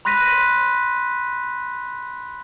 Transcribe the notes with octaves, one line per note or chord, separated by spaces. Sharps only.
B5 C6 F#6 A#6 B6 D#7